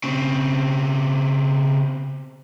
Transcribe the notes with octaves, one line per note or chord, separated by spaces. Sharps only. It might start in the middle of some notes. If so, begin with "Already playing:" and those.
C#3 C4